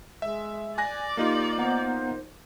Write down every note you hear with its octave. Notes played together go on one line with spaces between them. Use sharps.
G#3 E5
D5 G#5 F#6 A#6
A#3 D#4 F4 G4
B3 C5 F#5 A#5